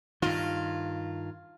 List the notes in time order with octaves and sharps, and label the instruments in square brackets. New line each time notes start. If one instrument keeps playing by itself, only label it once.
[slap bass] G2 D#3 [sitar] F4